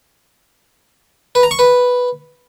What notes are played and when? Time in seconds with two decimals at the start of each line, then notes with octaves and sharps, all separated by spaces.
1.35 B4
1.43 A#5
1.51 C#6
1.59 B4